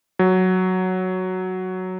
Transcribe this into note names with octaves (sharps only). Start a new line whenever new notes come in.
F#3